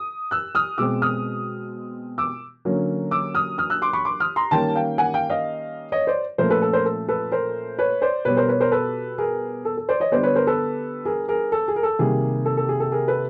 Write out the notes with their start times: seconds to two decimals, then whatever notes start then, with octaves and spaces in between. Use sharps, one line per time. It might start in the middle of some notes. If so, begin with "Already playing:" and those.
Already playing: D#6
0.31 E6 F#6
0.55 D#6 F6
0.78 B2 G#3 C4 D6 E6
1.02 D#6 F6
2.18 D6 E6
2.65 D3 F#3 A#3 C#4
3.11 D6 E6
3.35 D#6 F6
3.58 D#6 F6
3.70 E6 F#6
3.82 C6 D6
3.93 B5 C#6
4.05 C6 D6
4.20 D#6 F6
4.36 A#5 C6
4.51 D#3 G3 A#3 C#4 G5 A5
4.75 F5 G5
4.98 F#5 G#5
5.14 F5 G5
5.30 D#5 F5
5.92 C#5 D#5
6.07 C5 D5
6.38 A#2 F3 A3 C#4 A#4 C5
6.50 A4 B4
6.62 A4
6.73 A#4 C5
6.85 A4
7.08 A4 B4
7.32 A#4 C5
7.79 B4 C#5
8.01 C5 D5
8.25 B2 G3 B3 B4 C#5
8.37 A#4 C5
8.49 B4 C#5
8.60 A#4 C5
8.72 A4 B4
9.18 G#4 A#4
9.65 A4
9.77 A4
9.89 C5 D5
10.00 C#5 D#5
10.12 D3 G3 B3 C5 D5
10.23 B4 C#5
10.35 A#4 C5
10.47 A4 B4
11.05 G#4 A#4
11.28 G#4 A#4
11.52 A4
11.68 G#4
11.76 A#4
11.83 A4
11.99 C3 D#3 G3 A#3 G#4
12.46 A4
12.57 A4
12.69 G#4
12.80 A4
12.92 G#4 A#4
13.08 A4 B4